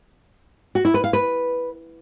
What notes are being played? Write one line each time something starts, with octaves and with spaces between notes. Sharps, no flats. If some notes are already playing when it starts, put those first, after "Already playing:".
F#4
E4
B4
F5
B4